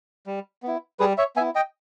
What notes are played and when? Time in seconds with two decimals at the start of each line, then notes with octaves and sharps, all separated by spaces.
0.27 G3
0.63 B3 E4
1.00 G3 G#4 B4
1.18 C#5 E5
1.36 B3 E5 G#5
1.40 E4
1.55 D#5 G5